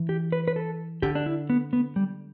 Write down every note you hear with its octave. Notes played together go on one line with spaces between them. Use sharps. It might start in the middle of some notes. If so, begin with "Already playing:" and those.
Already playing: E3
G4
B4
B4
A4
D3 G4
D4
E4
B3
B3
G3